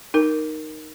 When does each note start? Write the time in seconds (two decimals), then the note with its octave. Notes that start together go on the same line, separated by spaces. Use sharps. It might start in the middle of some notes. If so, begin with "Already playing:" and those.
0.14 D#4 A#4